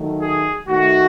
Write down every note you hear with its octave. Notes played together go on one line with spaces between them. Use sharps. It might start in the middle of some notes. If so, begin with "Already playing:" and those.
Already playing: D#3 F#3 A3
G#4
D#3 A3 F#4